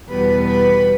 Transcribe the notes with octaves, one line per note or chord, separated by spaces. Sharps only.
E2 B2 G3 B3 B4
B4